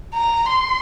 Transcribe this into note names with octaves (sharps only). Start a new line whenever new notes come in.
A#5
C6